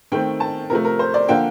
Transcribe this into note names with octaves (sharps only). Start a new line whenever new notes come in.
D#3 A3 C4 G5
A5
C3 F3 A3 A#4
A#4
C5
D5
D3 F3 A#3 G5